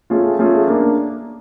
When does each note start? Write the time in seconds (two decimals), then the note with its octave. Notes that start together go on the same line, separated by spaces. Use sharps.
0.10 A3 C#4 F4 G#4
0.39 A3 C#4 F4 G#4
0.67 A#3 D4